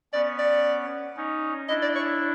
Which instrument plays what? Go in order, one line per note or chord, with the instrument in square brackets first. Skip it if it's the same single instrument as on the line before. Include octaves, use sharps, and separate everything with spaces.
[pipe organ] B3 C#4 [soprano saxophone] D5
[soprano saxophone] D5
[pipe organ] C#4 D#4
[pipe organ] D4 E4 [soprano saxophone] D#5
[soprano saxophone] D5
C#5